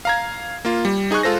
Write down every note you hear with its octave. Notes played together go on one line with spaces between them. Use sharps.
F5 A#5 G#6
A#3 F4
G3
D#4 G#4 G#5 C#6 F#6
G#3 F4 A4 C5 A#6